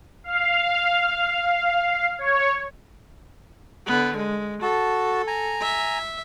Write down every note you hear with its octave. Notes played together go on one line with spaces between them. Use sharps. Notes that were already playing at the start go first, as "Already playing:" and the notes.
F5
C#5
D3 B3
G#3
F#4 A4 A5
G#5 A#5
E5